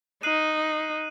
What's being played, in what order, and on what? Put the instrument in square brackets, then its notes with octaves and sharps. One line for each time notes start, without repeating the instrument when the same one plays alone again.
[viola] D#4 [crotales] F#6 C7 D#7 F#7